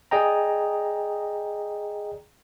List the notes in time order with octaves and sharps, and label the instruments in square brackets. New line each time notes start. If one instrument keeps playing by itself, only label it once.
[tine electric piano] G#4 D5 D#5 G5 A#5